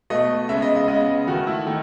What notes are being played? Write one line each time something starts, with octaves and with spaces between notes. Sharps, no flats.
B2 A3 D#5
C#3 G#3 B3 E5
D#5
D#5
C#3 G#3 B3 D#5
D#3 A3 F#4
E4
D#3 A3